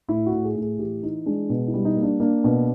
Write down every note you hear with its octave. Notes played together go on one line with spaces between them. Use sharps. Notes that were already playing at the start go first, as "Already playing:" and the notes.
A2 E4
F#4
A2
G#4
A2
G#4
E3 G4
E3 D#4
G#3 D4
B2
E4
G3
D#4
A#3
D4
A#3 D4
B2